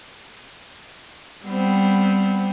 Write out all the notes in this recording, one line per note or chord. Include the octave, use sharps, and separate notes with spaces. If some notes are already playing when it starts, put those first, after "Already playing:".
G3 B3 C4